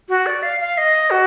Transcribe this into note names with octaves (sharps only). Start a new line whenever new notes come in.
F#4
D5
F5
F5
D#5
F#4